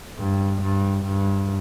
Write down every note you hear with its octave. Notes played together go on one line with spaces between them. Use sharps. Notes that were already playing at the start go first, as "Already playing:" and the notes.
G2
G2
G2